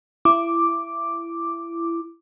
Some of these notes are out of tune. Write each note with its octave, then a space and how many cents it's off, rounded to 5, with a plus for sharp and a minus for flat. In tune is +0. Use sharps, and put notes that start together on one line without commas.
E4 +25 D6 +0